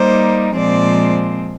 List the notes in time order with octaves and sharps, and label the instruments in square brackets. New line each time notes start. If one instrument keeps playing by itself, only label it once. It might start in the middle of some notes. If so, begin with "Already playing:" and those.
Already playing: [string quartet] G3 A#3 D#4 C5
A#2 F3 G#3 C4 D5